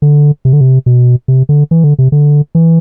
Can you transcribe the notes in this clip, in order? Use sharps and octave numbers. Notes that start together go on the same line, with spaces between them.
D3
C3
D3
C3
B2
C3
D3
E3
D3
C3
D3
E3